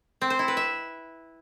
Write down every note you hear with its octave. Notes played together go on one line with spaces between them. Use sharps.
C4
C5
E4
B4
E5